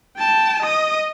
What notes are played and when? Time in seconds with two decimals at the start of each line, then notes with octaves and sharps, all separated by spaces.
0.18 G5 A5
0.62 D#5 D#6